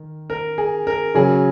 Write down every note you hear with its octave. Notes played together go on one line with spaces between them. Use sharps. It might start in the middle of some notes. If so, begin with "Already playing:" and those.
Already playing: D#3
A#4
G#4
A#4
C#3 F#3 C#4 G#4